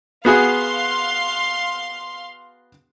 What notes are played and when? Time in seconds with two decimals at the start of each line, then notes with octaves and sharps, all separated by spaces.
0.25 B3 F#4 G#4 F5 C6